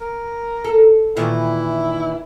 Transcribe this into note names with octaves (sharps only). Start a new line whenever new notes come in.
A#4
A4
A#2 D#3 E3 E4